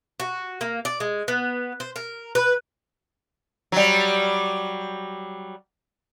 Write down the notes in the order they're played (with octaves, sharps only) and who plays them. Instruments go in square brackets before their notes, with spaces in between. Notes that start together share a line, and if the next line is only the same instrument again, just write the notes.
[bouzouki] F#4
A#3
D5
G#3
B3
C5
A#4
B4
[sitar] F#3 G3